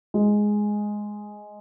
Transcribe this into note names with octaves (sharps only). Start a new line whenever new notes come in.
G#3